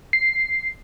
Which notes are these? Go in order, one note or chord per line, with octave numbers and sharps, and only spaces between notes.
C7